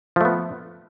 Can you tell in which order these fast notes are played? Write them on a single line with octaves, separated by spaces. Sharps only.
F3 A3 B3